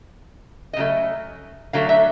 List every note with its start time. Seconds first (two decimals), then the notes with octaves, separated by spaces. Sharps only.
0.73 D#5
0.77 C#3 F#3 A3
1.73 D3 F#3 A3 F5
1.89 E5